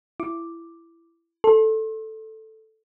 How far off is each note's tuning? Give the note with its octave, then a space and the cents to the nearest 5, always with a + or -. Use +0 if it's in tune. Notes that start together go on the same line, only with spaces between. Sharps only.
E4 +20 D6 +0
A4 +0 C6 +35